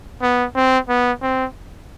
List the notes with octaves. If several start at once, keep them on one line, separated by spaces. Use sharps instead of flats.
B3
C4
B3
C4